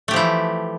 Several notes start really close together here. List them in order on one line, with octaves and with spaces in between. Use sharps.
A3 G4 F3 E4 E3